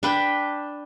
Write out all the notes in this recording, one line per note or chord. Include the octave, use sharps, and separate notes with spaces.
D4 B4 G5